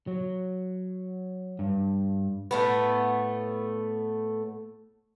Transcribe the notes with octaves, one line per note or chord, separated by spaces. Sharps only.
F#3
G2
A2 A3 B3